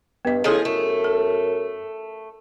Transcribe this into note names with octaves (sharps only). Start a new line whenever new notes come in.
G2 B3 D#5
C#3 F3 E4 G#4 A4 D#5
F#2 A3
A4